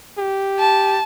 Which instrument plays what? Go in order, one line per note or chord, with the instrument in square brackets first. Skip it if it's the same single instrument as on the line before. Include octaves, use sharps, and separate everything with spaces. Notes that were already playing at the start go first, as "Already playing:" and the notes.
[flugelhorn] G4
[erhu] A5